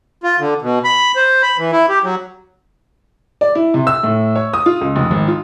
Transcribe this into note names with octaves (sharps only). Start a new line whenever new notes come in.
F4
D3
B2
B5
C5
B5
E3
E4
G4
F#3
D5
E4
C3
E6
A2
C#5
D#6
F4
C#2
F1
G#1
F4